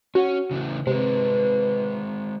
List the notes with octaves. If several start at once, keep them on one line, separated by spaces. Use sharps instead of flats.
C#4 F#4
C#3 E3 A3
C3 G#3 C4 B4